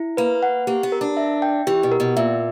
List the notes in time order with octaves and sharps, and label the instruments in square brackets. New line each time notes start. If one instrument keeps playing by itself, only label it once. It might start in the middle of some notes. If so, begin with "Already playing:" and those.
Already playing: [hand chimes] E4
[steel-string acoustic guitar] A#3 [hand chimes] B4
[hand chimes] F#5
[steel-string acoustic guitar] A#3 [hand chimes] G4
[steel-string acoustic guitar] B3
[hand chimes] A#4
[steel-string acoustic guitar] D4
[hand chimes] E5
G5
[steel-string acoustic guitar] E3 [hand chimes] G4
[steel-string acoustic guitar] B2
[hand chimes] A#4
[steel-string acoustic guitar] B2
[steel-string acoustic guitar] A#2 [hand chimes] E5